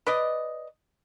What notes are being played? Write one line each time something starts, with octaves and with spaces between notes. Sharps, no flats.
B4 D5 D#5